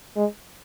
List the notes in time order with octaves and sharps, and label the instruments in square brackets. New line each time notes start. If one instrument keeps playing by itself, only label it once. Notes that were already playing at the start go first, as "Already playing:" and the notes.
[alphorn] G#3